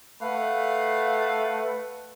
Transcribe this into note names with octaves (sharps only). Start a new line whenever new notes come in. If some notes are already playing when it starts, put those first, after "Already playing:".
A3 B4 F5 F#5